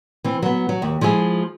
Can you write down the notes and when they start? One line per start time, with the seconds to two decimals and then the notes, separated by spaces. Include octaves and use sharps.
0.24 E3 C4
0.42 F#3 B3
0.69 F#3
0.82 D#2
1.01 F3 G#3 E4 G#4